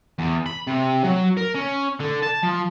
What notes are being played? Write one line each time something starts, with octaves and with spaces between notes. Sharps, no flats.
E2
B5
C3
F#3
A#4
C#4
D3
A5
F3